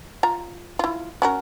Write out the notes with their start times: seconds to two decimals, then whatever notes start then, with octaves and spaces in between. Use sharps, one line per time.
0.23 F4 A#5
0.79 E4 F4
1.22 C#4 F#4 A#4